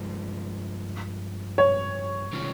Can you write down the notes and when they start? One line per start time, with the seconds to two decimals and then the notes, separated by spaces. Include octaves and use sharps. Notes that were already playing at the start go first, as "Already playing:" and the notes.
Already playing: G2 F3 G#3
1.58 C#5
2.33 C3 D#3 G#3 C#4 F4